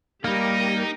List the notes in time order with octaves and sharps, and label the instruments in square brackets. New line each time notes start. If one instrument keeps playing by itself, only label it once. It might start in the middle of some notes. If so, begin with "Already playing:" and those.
[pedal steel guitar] G3 A#3 [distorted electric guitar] D#4 [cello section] G4 A#4